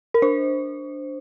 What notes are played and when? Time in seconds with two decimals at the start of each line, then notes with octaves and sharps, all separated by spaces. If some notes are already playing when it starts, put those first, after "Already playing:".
0.14 A#4
0.22 D4 C5